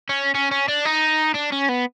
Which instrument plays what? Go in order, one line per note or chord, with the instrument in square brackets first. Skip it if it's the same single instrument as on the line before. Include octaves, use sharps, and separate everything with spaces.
[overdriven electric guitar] C#4
C#4
C#4
D4
D#4
D4
C#4
B3